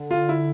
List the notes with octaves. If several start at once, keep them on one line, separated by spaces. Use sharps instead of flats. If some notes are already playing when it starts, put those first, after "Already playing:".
Already playing: D3
F4
E4